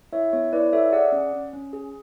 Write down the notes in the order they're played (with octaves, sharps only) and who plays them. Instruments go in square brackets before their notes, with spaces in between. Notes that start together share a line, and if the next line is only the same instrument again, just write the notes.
[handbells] E4 C#5 E5
B3 C#5
E4 B4 D5
A4 C#5 E5
G#4 D5 F#5
C#4
C#4
C#4
G#4